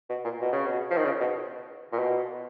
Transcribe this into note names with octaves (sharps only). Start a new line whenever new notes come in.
B2
A#2
B2
C#3
B2
F3
D#3
C#3
B2
A#2
B2